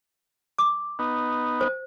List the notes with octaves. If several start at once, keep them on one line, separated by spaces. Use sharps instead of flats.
D6
B3 D#4
C5